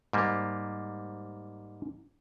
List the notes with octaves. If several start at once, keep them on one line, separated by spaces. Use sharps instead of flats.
G#2 G3 A#3